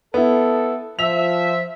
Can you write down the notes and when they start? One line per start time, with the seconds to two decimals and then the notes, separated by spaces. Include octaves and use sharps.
0.14 B3 E4 A4
0.99 F3 E5 F7